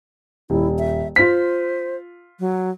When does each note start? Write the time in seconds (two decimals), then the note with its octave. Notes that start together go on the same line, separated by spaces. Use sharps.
0.50 D#1 E4
0.79 E5
1.16 F4 C5 B6
2.40 F#3